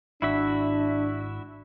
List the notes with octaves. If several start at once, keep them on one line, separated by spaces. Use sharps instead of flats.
G#1 D4 E4 F#4 E5